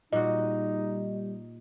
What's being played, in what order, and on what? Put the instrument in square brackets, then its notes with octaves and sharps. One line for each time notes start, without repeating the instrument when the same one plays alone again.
[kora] A#2 F#4 [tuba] G3 [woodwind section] D#4 [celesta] D#5